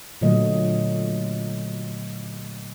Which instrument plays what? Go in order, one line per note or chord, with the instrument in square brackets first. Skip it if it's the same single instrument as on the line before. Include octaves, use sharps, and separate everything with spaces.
[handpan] A#2 D3 F#3 A3 D#5